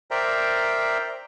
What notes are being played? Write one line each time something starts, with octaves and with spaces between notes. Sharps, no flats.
A#4 C5 D5 E5 G5 A#5